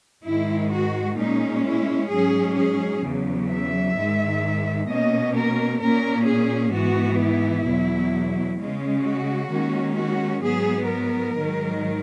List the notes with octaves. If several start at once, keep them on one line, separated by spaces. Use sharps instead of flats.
G#2 D#3 G#3 E4
F#4
A#2 G#3 C#4 D#4
E4
G#2 F#3 C#4 G#4
G#4
E2 C#3 F#3
E5
G#2 D#3 G#3
B2 A#3 C#4 D#5
A#4
A#2 A#3 C#4 A#4
G#4
G#2 E3 B3 F#4
E4
E2 B2 F#3
C#3 G#3 C#4
F#4
D#2 D#3 G#3 C#4
F#4
G#2 F#3 B3 G#4
A#4
G#2 D#3 F#3